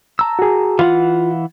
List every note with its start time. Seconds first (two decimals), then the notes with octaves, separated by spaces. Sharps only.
0.19 A5 A#5 E6
0.39 F#4 G#4
0.79 E3 F4 F5 F#5